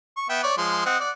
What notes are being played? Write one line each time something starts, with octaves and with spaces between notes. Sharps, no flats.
C#6
B3 E5 G5
C#5 D5
F3 G#3 C6
C4 D#5 F#5
D5 F#5